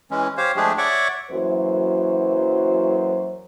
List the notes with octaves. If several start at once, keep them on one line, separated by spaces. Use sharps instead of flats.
E3 G#3 C#4
G4 C5 C#5 F5
F3 G#3 A3 D4 G4 G#4
C#5 D5 E5 F#5 C#6 D6
F#2 E3 F#3 A#3 C5